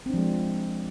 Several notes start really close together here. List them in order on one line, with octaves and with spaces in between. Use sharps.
C4 D4 F3 G#3